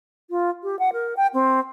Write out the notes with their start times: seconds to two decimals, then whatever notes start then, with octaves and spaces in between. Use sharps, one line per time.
0.30 F4
0.63 G4
0.79 F#5
0.93 A#4
1.17 G5
1.34 C4